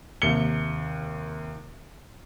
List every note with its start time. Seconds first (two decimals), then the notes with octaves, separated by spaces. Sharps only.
0.22 D#2 C3 C#7 G7